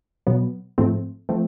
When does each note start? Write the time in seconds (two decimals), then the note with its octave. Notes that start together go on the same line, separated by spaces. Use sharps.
0.27 B2 F#3 B3
0.78 G#2 F3 A3 C4
1.29 F3 A3 C4